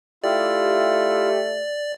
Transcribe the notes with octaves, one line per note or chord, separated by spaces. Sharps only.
A3 E4 F4 G4 D5